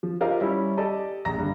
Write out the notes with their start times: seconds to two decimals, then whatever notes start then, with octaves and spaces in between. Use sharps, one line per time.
0.03 F3
0.21 F4 G4 A#4 C5 D#5 F5
0.41 G3 C#4 E4
0.77 G4 A4 D5 D#5
1.25 A#1 A#5 A#6
1.38 G2 D3